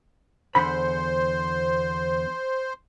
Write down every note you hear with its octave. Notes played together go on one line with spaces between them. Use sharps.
E2 D3 C5 B5